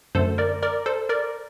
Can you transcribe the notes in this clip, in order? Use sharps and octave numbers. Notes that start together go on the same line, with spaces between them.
F#2 D3 A3 A4 C5
A#4 D5
A#4 D5
A4 C5
A#4 D5